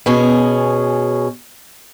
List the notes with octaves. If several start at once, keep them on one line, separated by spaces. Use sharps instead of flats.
B2 C#4 G#4